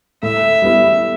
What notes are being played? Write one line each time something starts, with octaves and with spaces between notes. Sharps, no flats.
A2 E5
G3 B3 E4